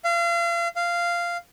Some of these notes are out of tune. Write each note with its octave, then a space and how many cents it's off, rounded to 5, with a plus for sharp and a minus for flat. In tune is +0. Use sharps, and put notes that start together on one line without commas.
F5 -35
F5 -10